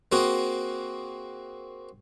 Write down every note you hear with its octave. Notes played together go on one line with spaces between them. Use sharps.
A#3 C4 F#4 G#4